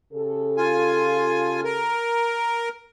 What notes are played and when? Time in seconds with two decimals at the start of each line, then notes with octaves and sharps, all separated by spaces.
0.13 C#3 G4 A4
0.57 F4 G#5
1.65 A#4